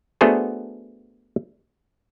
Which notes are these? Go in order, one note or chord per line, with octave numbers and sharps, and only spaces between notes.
A3 B3 D4 F#4 G#4 C5